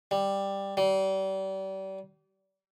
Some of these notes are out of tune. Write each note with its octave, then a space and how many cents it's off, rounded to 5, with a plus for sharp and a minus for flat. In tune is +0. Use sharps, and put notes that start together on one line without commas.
G3 +5
G3 -35